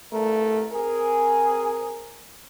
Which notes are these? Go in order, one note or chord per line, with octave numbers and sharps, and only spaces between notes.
C2 G2 A3 A#4
C4 G#4 A#4